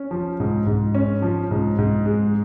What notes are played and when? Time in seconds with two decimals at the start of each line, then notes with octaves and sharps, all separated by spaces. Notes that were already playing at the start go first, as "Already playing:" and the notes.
Already playing: C#4
0.11 F3
0.40 G#2
0.67 G#2
0.95 C#4
1.22 F3
1.51 G#2
1.79 G#2
2.06 G#3